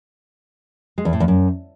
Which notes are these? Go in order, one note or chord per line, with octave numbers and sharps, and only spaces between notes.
G#3
E2
A2
E2
F#2